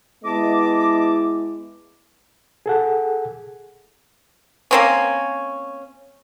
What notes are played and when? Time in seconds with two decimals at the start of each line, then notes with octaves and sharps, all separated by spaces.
0.24 G#3 B3 E4 D#5 A5 D6
2.66 G#4 A4 F#5
4.71 A#3 C4 C#4